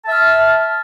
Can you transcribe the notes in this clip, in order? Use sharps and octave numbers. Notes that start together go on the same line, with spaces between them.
E5 A5 F6